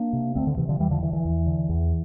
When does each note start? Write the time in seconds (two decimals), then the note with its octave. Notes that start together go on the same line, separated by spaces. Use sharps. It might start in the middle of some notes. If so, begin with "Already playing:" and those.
Already playing: A#3 D4
0.13 C3
0.35 D2 A3 C4
0.47 D3
0.57 C3 E3
0.69 D3 F3
0.80 E2 E3 G3
0.91 D3 F3
1.02 D3 E3
1.13 E3
1.25 E2
1.47 D3
1.69 E2